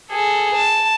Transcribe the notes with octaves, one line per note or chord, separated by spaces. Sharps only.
G#4 A4
A5